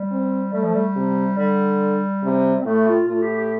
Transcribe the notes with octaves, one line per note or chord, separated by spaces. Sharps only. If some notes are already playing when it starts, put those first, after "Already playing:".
Already playing: G3
C4
G3 A3
F3
G3
C3
D3 G3
C3
C4
A2 A3
F4
A2 F4
G4
G4